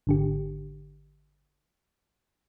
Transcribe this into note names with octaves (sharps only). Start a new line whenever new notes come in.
G#1 D3 G4